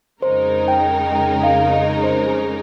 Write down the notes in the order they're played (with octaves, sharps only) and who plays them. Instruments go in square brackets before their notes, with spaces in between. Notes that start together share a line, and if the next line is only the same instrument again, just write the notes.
[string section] F2 C#3 G#3 D#4 A#4 [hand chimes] C5
[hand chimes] G5
G5
F5
D#5
C5
G#4